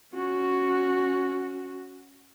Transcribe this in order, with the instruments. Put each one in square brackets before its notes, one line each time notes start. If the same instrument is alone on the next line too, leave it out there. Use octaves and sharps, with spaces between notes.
[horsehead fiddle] C#4 F#4